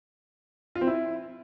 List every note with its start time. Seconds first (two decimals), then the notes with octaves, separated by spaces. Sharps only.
0.75 F4
0.81 C4
0.87 E4